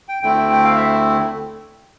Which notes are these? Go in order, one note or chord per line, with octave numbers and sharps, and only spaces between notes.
G5
D2 D3 A3 C4 E4 G5
G5
F5
E5